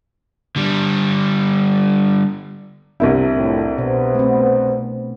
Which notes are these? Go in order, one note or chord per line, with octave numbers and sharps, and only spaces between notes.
D3 G3
C2 C3 D4 E4 A#4
F2 A2
B2 B3 C5
A3 C4